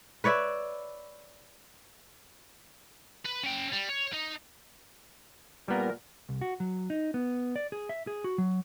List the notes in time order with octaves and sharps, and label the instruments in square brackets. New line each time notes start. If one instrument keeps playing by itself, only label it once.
[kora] B4 C#5 D5 E5
[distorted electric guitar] B4
C#4 G5
G3
C#5
D#4
[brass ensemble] A#2 A#4 [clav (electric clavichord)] G3 B3
[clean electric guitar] C2
F#4
F#3
D#4
B3
D5
G#4
E5
G#4
F#4
F#3